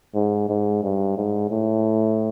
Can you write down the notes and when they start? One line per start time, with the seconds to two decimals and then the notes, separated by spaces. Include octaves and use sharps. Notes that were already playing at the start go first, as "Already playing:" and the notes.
0.14 G#2
0.49 G#2
0.83 G2
1.17 G#2
1.50 A2